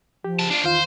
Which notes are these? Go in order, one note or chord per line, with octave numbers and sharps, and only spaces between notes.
F3 G4
C#3 A5
D4 F4
E2 D#3 F4 C5 F5